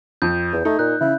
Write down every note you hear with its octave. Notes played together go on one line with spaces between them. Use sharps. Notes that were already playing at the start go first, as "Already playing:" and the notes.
F2 G6
E2
A3 D#4
A#2 F#6
C#3 E4